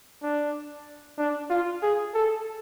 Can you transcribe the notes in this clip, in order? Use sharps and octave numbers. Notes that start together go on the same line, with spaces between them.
D4
D4
F4
G#4
A4